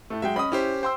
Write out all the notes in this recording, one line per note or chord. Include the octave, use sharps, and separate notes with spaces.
A2 A3
F#3 G#3 E5 G5
C#4 D#5 B5 D#6
C#4 E4 G4 C5
C5 G5 C6 E6